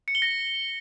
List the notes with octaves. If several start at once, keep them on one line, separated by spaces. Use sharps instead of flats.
C#7
G7
A#6